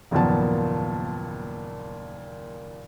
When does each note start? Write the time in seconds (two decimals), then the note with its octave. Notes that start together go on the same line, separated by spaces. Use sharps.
0.11 F#1 D#2 A#2 F3 B3 A5